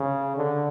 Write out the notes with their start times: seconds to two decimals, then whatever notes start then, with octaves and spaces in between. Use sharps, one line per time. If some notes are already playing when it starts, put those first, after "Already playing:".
Already playing: C#3
0.36 D3